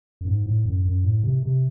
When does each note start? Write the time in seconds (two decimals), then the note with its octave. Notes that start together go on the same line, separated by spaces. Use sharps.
0.21 F#2
0.26 G#2
0.46 A2
0.66 F#2
0.85 F#2
1.04 A2
1.23 C3
1.43 C3